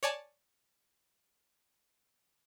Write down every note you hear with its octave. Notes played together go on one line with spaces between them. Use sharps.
C#5 D5 G#5 A5